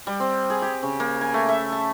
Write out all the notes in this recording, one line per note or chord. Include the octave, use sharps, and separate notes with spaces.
G3
C4
G#4
G4
C#3
A#3
G#5
A3
E5
A5